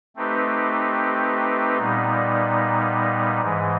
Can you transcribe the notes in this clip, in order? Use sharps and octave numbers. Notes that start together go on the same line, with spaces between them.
A3 C4 D#4 G4 B4
A#2 G3 B3 D#4
G#2 E3 G#3